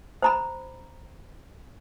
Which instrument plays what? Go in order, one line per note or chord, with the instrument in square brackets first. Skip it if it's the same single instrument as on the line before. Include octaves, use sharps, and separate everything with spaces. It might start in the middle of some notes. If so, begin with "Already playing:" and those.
[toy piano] C5 A#5 B5